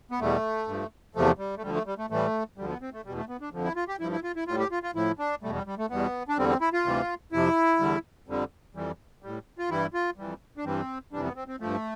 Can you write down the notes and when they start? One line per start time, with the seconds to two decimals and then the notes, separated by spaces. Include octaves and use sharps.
0.11 B3
0.20 E2 B2 G3 A3
0.68 G2 F3
1.15 E2 C3 F3 A3
1.38 G3
1.57 A3
1.62 D2 D3 F3 G3
1.74 A3
1.86 G3
1.98 A3
2.10 A2 E3 G3 A3
2.58 D2 D3 F3 G3
2.69 B3
2.81 C4
2.93 A3
3.05 E2 B2 G3
3.17 A3
3.29 B3
3.41 D4
3.52 F2 D3 F3
3.64 E4
3.76 F4
3.88 G4
4.00 G2 F3 E4
4.12 E4
4.24 F4
4.36 E4
4.47 A2 G3 F4
4.59 G4
4.71 F4
4.83 F4
4.95 A2 F3 E4
5.19 D4
5.43 E2 B2 G3 A3
5.55 G3
5.67 G3
5.78 A3
5.90 E2 B2 G3 B3
6.28 D4
6.38 E2 D3 G3 C4
6.49 C4
6.61 E4
6.73 F4
6.85 D2 C3 E3 G3
7.32 F2 C3 F3 E4
7.80 E2 D3 G3
8.27 F2 D3 G3
8.75 F2 E3 G3
9.22 A2 G3
9.58 F4
9.70 G2 E3 G3 E4
9.94 F4
10.18 F2 E3 G3
10.57 D4
10.65 G2 E3 G3 C4
11.12 F2 C3 E3 G3 D4
11.24 B3
11.36 C4
11.48 C4
11.60 G2 F3 A3